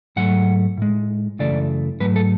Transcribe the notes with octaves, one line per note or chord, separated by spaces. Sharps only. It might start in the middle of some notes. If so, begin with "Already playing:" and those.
G#2 F#3 A3 F#5
A2 G#3
F#2 C#3 E3 A3 D5
G#2 F#3 A3 B4
A4